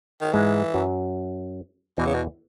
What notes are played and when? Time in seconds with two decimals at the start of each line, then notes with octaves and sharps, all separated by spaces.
0.22 D#3
0.33 G#2 E3 G#3
0.74 F#2 F#3
1.98 E2 B2 E3
2.06 C#3
2.14 B2